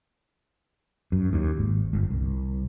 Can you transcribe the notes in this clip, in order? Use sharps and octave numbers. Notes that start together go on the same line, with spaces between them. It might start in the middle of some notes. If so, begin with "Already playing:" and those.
F#2
D#2
G#1
G1
C2